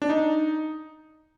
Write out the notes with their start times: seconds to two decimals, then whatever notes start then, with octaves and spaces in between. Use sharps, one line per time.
0.02 D4
0.09 D#4